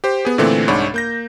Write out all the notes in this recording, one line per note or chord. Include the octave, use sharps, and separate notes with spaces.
G4 C5
B3 G#4
A#2 D3 E3 A3 C4
C2 G#2 D4 C#5 B5 C#6
A#3 G6 A#6